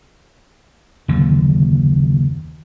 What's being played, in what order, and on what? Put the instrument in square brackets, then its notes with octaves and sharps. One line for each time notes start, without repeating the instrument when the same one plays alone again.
[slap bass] F#1 D#2 D3